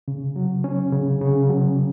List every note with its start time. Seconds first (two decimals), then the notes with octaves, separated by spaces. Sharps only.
0.08 C#3
0.36 F#3
0.64 C#4
0.93 C#3
1.21 C#3
1.50 F#3